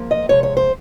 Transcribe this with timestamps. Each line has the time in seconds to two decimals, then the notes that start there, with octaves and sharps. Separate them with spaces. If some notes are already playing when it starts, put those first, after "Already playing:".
Already playing: G#2 F3 A#3
0.11 D#5
0.29 C3 F3 G#3 C#5
0.43 C#5
0.57 C5